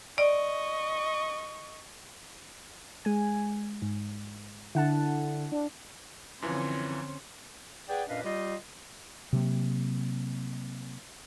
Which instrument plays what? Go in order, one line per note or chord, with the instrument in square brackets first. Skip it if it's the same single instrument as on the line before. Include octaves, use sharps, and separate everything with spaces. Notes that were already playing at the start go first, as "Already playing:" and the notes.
[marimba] D5 [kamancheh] D#5 C#6
[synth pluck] G#3 G#5
G#2
[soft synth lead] D3 [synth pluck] E4 F#5 A5
[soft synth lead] D4
[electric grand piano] F#2 E3 F3 [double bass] D3 C4 [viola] C#4 C5
[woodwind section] G#4 B4 D5 F#5 G5
F#2 A#2 D4 B4 D#5 F5
G3 F4 G4 D#5
[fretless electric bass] C3 F#3 A#3